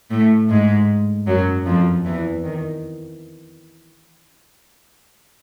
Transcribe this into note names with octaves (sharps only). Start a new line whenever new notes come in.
A2 A3
G#2 G#3
F#2 F#3
F2 F3
E2 E3
D#3